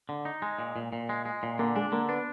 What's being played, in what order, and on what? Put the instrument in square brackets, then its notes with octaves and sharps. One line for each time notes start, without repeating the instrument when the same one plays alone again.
[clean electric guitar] D3
D#4
G#3
A#2
A#2
A#2
G#3
G#3
A#2
[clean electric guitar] D3 [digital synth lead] A#3
[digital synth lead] G#3 [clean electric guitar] D4
[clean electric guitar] D3 [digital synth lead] A#3
[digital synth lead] B3 [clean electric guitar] D4